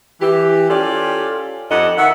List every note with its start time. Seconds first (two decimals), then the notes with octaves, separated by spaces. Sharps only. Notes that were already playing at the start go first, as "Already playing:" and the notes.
0.21 E3 G4
0.70 C#4 F4 G4 A4 D5
1.70 F2 G4 A4 D#5 F#5
1.98 D#3 E5 F#5